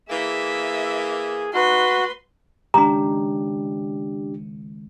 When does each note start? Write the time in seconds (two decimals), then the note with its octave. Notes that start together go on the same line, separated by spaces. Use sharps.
0.10 E3 A#3 G#4 E5
1.54 D#4 F#4 B4 C6
2.74 C#2 D#3 D4 G4 A#5